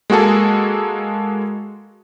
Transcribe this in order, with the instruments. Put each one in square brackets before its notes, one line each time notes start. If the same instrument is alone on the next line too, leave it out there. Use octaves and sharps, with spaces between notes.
[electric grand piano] G#3 A#3 F#4 G#4 A4